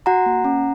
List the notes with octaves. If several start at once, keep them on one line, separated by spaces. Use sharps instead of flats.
F#4 F#5 A#5
A#3
C#4